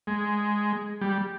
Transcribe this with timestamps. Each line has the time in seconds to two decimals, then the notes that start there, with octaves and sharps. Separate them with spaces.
0.07 G#3
1.01 G3